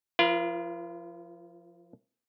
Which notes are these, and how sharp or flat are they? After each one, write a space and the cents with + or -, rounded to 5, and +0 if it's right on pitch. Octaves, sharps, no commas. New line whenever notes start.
F3 +0 F4 -40 A#4 +40